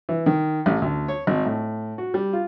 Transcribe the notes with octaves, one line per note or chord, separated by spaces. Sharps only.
E3
D#3
A1
D2
C#5
G#1
A2
F#4
G3
F4